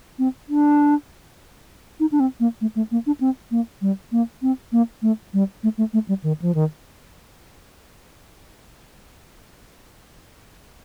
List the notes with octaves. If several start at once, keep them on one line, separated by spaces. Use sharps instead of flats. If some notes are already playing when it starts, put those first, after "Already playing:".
C4
D4
D#4
D4
C4
A#3
A3
A3
A#3
D4
C4
A#3
G3
A#3
C4
A#3
A3
G3
A3
A3
A3
G3
D#3
F3
D#3